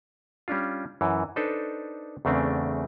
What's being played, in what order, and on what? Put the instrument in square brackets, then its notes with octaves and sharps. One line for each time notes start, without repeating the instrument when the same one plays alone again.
[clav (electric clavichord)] G3 C#4 D4 F4
F#2 E3
D4 D#4 A4 B4 C5
E2 C#3 A3 C4 D4